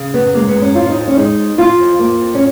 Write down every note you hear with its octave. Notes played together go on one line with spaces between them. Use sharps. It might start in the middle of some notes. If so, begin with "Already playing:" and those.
Already playing: C#3
F#2 B3
G#3 A#3
B3
F#2
C#4
F3 F4
C#4
D#4
F2
C#4
G#3 D#4
F2
F3 F4
F2
A#3
F2
C#4